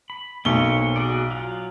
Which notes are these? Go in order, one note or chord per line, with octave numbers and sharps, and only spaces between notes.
B5
B1 A#3 C4 C#5 G7
F#4 G#4 D5
F#3 F4